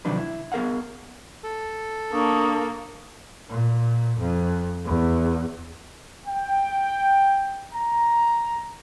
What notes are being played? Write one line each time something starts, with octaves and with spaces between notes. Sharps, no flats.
C3 D#3 F3 F#3 D4 B4
E4
B3 G#4 A#4 F5 F#5
A4
A#3 D4 C#6 D#6
A#2
F2
E2
G5
A#5